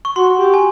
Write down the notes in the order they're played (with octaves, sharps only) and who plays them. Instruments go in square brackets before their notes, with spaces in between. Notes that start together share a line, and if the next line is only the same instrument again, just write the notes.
[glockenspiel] C#6
[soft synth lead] F#4 [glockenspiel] C6
[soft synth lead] G4
[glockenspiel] G#5